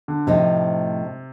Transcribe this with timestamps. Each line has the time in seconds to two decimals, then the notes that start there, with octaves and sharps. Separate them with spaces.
0.08 D3
0.27 A2 C3 F3 A3 D#4